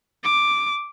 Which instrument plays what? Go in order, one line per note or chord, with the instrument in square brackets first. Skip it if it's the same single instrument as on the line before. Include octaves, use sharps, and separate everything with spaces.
[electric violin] D6